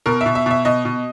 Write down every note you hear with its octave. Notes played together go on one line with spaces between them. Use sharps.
B2 A#4
E5
B2
E5
B2 E5
B2 D#5
B2